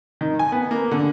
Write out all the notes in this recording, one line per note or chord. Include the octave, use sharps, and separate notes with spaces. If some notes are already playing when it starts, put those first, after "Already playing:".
D#3
G#5
B3
A#3
D3